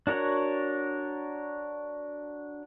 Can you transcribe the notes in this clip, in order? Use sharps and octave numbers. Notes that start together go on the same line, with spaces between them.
D4 F#4 A#4 C#5 F#5